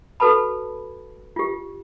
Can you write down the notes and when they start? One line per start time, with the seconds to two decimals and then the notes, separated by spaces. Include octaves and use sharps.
0.20 F#4 A4 B4 A5 B5
1.36 F4 G4